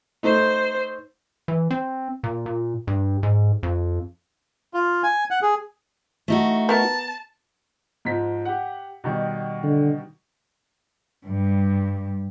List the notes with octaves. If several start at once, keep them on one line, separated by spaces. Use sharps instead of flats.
A3 D#4 C5
E3
C4
A#2
A#2
G2
G#2
F2
F4
G#5
F#5
G#4
A3 D#4 F#4
B3 A#4 A5
G#2 F3 B6
G4 F#5
B2 D#3 G3
D3
G2 G3